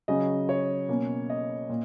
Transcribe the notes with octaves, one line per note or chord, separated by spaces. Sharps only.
C#3 F#3 C#4 D#5
C#5
B2 A#3 C#4
D#5
A#2